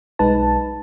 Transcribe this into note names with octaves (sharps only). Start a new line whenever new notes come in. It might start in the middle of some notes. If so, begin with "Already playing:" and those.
B1 G#3 D#4 B4 A5